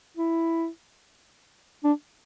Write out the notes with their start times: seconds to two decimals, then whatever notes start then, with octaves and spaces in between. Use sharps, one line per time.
0.17 E4
1.84 D4